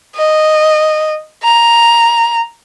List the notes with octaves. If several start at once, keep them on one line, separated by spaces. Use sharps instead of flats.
D#5
A#5